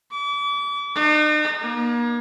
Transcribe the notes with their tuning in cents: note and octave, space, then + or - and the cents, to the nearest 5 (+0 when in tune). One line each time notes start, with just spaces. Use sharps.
D6 -40
D#4 -45
A#3 +35